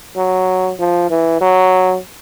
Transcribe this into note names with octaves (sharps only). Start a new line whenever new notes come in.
F#3
F3
E3
F#3